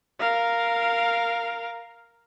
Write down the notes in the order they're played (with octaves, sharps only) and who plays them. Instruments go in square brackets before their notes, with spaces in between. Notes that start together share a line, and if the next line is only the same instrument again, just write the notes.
[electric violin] A#4 F5